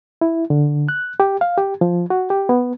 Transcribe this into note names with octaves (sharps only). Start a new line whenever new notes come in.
E4
D3
F#6
G4
F5
G4
F3
F#4
G4
B3